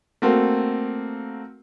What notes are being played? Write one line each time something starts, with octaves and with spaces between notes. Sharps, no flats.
A3 A#3 C4 F#4 A4 A#4